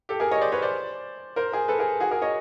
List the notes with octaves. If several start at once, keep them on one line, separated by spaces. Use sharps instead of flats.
G4 A4
G#4 A#4
C#5 D#5
C5 D5
B4 C#5
C5 D5
A#4 C5
G#4 A#4
A4 B4
G#4 A#4
F#4 G#4
G#4 A#4
C#5 D#5